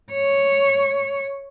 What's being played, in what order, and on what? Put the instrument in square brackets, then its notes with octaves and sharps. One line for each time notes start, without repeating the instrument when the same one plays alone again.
[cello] C#5